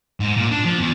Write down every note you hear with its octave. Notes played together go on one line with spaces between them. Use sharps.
G#2
A#2
D4
F3
E2